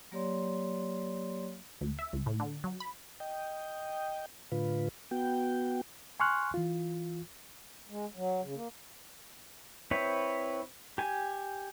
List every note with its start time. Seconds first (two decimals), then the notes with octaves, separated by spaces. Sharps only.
0.12 F#3 A#3 G4 C#5 D5 C6
1.81 D2
1.99 E5
2.13 C#2
2.26 A2
2.40 D3
2.64 F#3
2.80 B5
3.20 D#5 G5
4.52 A2 D3 F4 B4
5.11 B3 F#4 G5
6.20 G#5 C6 C#6 F6 F#6
6.54 E3 F4
7.89 G#3
8.16 F#3
8.42 C#3
8.55 A#3
9.91 C4 E4 B4 C#5
10.98 G4 G#5